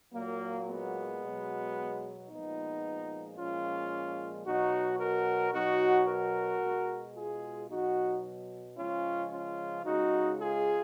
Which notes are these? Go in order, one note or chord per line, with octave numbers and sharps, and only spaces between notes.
A#2 F#3 A#3
G#3 B3
B2 F#3
A#2 F3 G#3 B3 D#4
A#2 F3 G#3 C#4 F4
B2 F#3 D#4 F#4
F#4 A#4
B2 F#3 D#4 F#4
F#4 A#4
B2 G#3
F4 G#4
B2 F#3 D#4 F#4
C#3 F3 G#3 C#4 F4
C#4 F4
C#3 G#3 D#4 F#4
F4 G#4